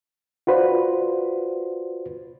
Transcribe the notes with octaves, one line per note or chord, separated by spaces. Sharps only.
F4 F#4 B4 C5 D5